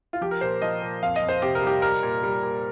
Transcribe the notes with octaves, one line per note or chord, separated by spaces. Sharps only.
F4
F3 G4
A#4
A#2 C5
F3 D#5
A#2
F2 F5
D#5
F2
C5
C3 G4
A#4
G3
G4
G3 A#4
A#2
G3
A#2